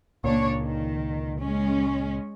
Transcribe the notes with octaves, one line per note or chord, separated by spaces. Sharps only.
C#2 A#2 A#3 D4 C#5
D#3
G#3 C#4